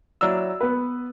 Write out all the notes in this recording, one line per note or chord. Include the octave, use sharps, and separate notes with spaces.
F#3 E4 D5 A#5 E6
B3 B4